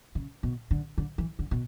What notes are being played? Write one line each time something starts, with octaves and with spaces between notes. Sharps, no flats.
C#3
B2
D3
D3
E3
D3
B2